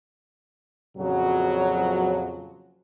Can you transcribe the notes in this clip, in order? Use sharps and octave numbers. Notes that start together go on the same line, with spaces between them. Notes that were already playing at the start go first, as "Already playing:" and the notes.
F2 A#2 C#3 F3 F#3